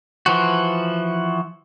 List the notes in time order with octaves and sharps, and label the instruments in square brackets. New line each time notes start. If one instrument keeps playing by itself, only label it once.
[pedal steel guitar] E3 F3 F#4